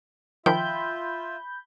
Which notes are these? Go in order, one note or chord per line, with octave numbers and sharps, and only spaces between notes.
D#3 F3 F4 E5 G5 B5 G6